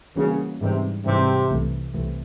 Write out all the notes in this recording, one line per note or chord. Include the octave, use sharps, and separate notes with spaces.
C#3 E3 G3 A#3 C#4 F#4
G#2 C3 E3 G3
G#2 C3 E3 G3
C2 C3 E3 A3
C2 C3 E3 A3